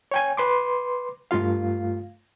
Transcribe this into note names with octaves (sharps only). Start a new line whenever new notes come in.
C#5 G5 G#5
B4 C6 D6
G2 A3 F4 F5